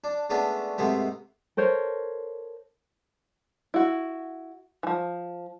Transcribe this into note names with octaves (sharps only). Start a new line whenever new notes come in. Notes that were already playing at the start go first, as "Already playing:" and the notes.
D4
G#3 A3 B3 C#4 D4
G#2 C3 G#3 A3 B3
A4 A#4 C5 C#5
E4 F#4
E3 F3